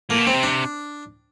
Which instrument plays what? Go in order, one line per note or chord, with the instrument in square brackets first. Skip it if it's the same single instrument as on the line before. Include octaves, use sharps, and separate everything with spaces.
[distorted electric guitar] A2 [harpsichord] A#3
[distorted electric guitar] B2
[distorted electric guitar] C#3 [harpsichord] C4
[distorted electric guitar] C3
[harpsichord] D4